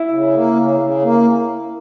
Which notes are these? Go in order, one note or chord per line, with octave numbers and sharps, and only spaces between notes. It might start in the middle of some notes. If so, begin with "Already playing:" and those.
Already playing: E4
C#3
A#3
C#3
C#3
A#3